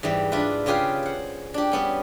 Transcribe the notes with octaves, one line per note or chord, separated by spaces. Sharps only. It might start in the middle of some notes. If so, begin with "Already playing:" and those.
G#2 E3 G3
D4 E4 F4 B4
C#3 F4 G4 G#4 B4 F5
C5 F#5
D4 G4
G3 B3 C#4